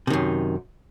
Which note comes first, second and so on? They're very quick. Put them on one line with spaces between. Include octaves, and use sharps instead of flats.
C3 D#3 F#2